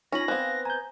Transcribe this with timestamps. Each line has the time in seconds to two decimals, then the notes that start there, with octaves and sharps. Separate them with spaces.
0.12 C#4 D#4 F4 A#6 F#7
0.28 B3 C4 F5 G#5 F#6
0.65 G#5 A#5 G6